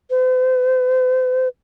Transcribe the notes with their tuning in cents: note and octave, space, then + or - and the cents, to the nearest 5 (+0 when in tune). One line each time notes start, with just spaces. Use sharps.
C5 -45